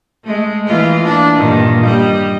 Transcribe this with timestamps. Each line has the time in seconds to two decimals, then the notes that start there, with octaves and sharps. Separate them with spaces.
0.24 G#3 A3
0.66 E3 A#3 F4
1.06 D4
1.36 G2 A#2 D#3
1.84 G3 D#5